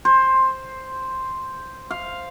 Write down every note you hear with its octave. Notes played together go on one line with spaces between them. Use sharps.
C5
F5